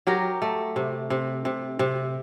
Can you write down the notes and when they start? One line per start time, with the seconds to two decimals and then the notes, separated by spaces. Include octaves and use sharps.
0.07 F#3 G4 A#4
0.42 A3
0.76 C3
1.10 C3
1.45 C3
1.79 C3